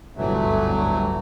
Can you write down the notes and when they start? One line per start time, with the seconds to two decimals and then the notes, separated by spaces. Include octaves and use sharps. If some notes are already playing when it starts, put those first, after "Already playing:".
0.17 G1 D2 A2 E3 F#3 A3